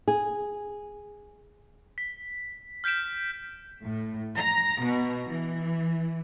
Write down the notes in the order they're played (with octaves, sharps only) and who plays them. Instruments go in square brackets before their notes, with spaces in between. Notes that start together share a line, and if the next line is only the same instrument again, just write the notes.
[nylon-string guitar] G#4
[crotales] B6
F6 G6 B6 D7 E7
[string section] A2
A#5
B2
E3